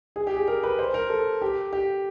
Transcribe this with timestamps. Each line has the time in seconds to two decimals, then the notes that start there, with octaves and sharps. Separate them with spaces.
0.16 G#4
0.27 G4
0.36 G#4
0.47 A#4
0.63 B4
0.79 C5
0.94 A#4
1.10 A4
1.42 G4
1.72 G4